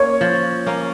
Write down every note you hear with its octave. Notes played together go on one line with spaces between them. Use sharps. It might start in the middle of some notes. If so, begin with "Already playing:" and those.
Already playing: A#3 C#4 C#5
F3
A#3 C#4